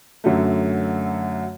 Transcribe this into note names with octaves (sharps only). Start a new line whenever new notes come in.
F#2 D3 F#3 A3